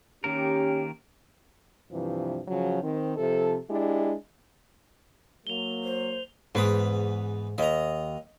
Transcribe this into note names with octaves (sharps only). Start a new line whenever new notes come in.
D#3 A#3 C#4 G4 A#4
G2 C3 E3 F3
C#3 F3 F#3
D#3 C4
C3 F3 A4
G#3 D4 E4 G4
F#3 A#3 F7 G7
C5
E2 G#2 B4 D#6
D#2 D#5 A#5